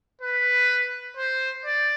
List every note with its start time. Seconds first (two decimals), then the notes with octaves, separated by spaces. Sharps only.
0.21 B4
1.17 C5
1.65 D5